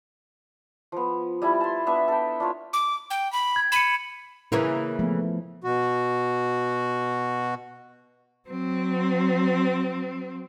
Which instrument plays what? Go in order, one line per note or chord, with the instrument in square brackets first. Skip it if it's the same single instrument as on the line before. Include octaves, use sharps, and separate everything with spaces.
[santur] F3 B3
G3 E4 A5
A5 C6
B3 D4 B4 E5
A4 G5
D4 F4 C#5
[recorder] D6
G5
B5
[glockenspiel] G#6
[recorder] B5 [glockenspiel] C#7 D#7 E7
[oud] C#3 E3 A#3 [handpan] E4 B4
[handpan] F3 A3 B3
[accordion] B2 F#4
[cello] F#3 C4